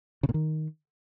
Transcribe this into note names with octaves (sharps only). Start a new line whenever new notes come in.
C#3
A#2
D#3